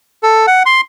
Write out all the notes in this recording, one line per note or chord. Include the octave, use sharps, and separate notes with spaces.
A4
F#5
C6